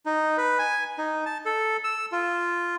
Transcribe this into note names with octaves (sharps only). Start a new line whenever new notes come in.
D#4
B4
G#5
D#4
A5
A4
E6
F4